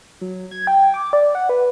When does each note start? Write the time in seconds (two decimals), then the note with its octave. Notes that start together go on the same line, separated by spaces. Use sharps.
0.21 F#3
0.51 G#6
0.67 G5
0.94 D6
1.13 D5
1.35 F#5
1.49 B4